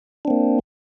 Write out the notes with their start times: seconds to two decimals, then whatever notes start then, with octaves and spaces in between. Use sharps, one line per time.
0.25 D4
0.28 C4
0.30 A#3